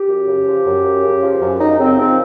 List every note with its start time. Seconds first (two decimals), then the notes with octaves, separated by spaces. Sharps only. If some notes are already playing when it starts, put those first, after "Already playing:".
Already playing: G4
0.09 F#2
0.28 C#3
0.47 F3
0.66 F#2
0.84 F#2
1.03 C#3
1.23 F3
1.42 F#2
1.59 F#2 D#4
1.79 C#3 C4
1.97 F3 C4